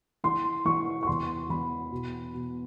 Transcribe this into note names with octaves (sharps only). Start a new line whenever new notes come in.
E3 C6
E3 C#6
C#6
E2 C6
E2 B5
B2
B2